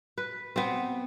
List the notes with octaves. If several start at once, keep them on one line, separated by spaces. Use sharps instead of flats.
B4
B3 C4